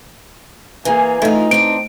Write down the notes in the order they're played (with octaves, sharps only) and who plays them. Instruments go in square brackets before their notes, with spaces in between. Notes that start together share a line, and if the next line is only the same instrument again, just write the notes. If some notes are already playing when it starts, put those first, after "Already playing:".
[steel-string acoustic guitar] E3 [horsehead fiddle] A#3 G#4
[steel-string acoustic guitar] E3 F4 [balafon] A3 A4 E5 [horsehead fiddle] D#4
[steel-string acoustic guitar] C4 D4 [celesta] D7